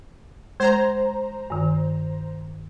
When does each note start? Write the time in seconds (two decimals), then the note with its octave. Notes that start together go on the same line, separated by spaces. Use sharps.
0.60 G#3 C5 A#5 G#6
1.50 G2 D#3